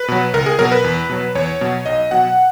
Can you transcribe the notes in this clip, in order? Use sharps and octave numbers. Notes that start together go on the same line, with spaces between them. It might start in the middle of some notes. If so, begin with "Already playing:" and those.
Already playing: B4
B2 F#3
C#2 A#4
G#4
B2 F#3 A#4
B4
E2
B2 F#3
E2 C#5
B2 F#3
B1 D#5
B2 F#3 F#5